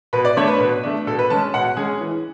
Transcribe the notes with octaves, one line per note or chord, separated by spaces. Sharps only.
B2 B4
D5
A3 D4 C#5
B4
B2
A3 D4
B2 A4
B4
G#3 C#4 A5
B2 F#5
G#3 C#4 G#4
E3